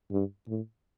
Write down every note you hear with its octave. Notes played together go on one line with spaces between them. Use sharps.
G2
A2